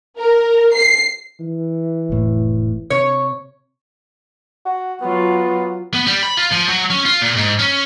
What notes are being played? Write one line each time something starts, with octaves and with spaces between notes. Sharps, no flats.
A#4
C7
E3
F1 A2
C3 C#5
F#4
F#3 B3 F4
B3
G3
B5
F4
F3
F#3
C#4
F4
A#2
G#2
C#4